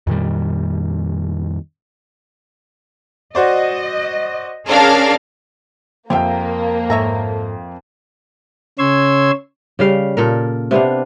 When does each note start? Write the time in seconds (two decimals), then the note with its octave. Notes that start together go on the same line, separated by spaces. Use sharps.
0.07 F2 A#2 D#3 G3
3.35 F#4 C5 D5 D#5
4.68 C#4 D4 G#4 A#4 F5
6.10 F2 A#3 G4 E5 F5 G5
6.90 G#2 A4 C#5 E5 A#5
8.79 C#3 C#4 C#5 C6 E6 G#6
9.79 C#3 G3 F5
10.17 A#2 A4 A#4
10.71 C3 B3 D4 F5